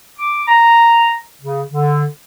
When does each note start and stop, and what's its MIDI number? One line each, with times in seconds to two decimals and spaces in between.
0.18 0.44 86
0.48 1.17 82
1.42 1.63 49
1.72 2.04 50